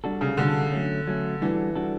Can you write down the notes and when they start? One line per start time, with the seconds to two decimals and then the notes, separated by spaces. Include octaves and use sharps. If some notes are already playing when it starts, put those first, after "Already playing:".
0.04 G3 D4 F#4 A4
0.21 C#3
0.37 D3 G3 D4 F#4 A4
0.72 F#3 A3 C#4
1.07 F#3 A3 C#4
1.41 E3 G3 D4 F#4 A4
1.76 G3 D4 F#4 A4